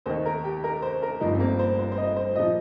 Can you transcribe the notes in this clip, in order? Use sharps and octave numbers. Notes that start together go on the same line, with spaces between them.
D#2 D#3 C5
A#4
G4
A#4
C5
A#4
G1 G2 F3 D#4
C4
A#3
C5
C5
C5
D#5
C5
A#2 F3 D#5